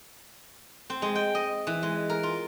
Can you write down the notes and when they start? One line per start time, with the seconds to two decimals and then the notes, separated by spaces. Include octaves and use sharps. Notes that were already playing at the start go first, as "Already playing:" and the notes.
0.90 C4
1.02 G#3
1.15 G5
1.35 D#5
1.67 E3
1.83 G#3
2.10 A#4
2.23 F4